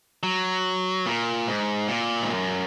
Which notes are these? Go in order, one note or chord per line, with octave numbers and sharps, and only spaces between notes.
F#3
A#2
G#2
A#2
G#2
F#2